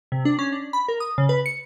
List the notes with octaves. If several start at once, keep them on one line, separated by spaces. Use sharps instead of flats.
C3
D4
C#4
D4
B5
A#4
D#6
C#3
B4
C#7